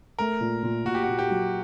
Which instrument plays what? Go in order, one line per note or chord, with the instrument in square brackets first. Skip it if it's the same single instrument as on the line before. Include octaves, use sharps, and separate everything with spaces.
[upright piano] A3 [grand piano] A#4
[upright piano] A#2
A#2
[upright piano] A#2 [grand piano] F#4
[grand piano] G4
[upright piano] A#2 [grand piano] F#4
[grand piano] G4
[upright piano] F#3